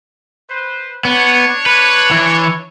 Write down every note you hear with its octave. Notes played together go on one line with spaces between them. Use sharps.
B4 C5
B3 D4 C#5
B4
E3